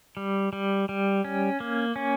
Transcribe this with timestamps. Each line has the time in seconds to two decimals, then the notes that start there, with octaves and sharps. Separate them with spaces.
0.17 G3
0.53 G3
0.89 G3
1.24 C#4
1.60 A#3
1.96 C#4